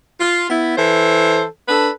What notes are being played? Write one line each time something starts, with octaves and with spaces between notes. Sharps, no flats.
F4
B3 E4
E3 A4 C5
D4 A4 B4